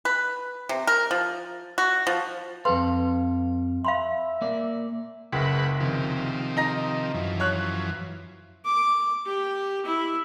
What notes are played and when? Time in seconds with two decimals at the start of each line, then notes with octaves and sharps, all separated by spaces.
0.05 B4
0.69 C3
0.87 A#4
1.11 F3
1.78 F#4
2.07 F3
2.65 F2 A4 B4 F5 C6
3.85 E5 F5 B5 C6
4.42 A#3 D5
5.32 F#1 C#2 B4 F#5
5.80 C3 D#3 F3
6.57 D#4 A#5 A#6
7.14 F#2 E3 F3
7.40 C#5 F#6
8.65 D6
9.27 G4
9.86 E4